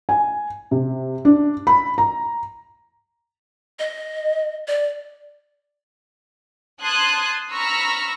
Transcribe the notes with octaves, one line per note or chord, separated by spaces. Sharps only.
G#5
C3
D4
B5
A#5
D#5
D5
A5 C6 D#6 F#6 G#6 C7
A#5 B5 C#6 E6 F6 A#6